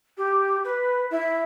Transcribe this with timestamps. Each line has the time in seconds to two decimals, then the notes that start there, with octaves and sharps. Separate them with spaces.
0.17 G4
0.64 B4
1.11 E4